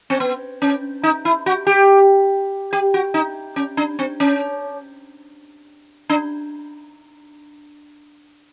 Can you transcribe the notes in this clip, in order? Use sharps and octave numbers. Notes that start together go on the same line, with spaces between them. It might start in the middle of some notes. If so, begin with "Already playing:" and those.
C4
B3
C#4
D#4
E4
F#4
G4
G4
F#4
D#4
C#4
D4
C4
C#4
D4